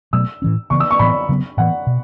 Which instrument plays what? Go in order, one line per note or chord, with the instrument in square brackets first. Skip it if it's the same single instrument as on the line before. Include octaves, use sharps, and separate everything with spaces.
[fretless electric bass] B2 F#3 A3 [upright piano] E6
[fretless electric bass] A2 E3 C#4
[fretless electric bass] C#3 E3 B3 [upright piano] C#6
[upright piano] E6
C#6
[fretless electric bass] A2 E3 B3 [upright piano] B5
[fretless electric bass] C#3 F#3 B3
[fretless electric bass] A2 E3 B3 [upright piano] F#5
[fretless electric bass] B2